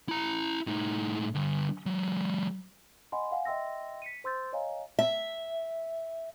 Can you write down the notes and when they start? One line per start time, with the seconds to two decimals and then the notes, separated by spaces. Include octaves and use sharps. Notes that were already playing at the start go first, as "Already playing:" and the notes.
0.09 E4 A#5
0.67 A2 D#4
1.35 D3 G3
1.86 F#3 G#3
3.12 D#5 F#5 G#5 B5 C6
3.31 F5 F#5 G#5
3.45 D#5 E5 G5 C6 E6 A#6
4.02 B6 C#7 D#7
4.24 C5 C6 E6 G6 A6
4.53 C#5 D#5 F5 G#5 A#5
4.99 E5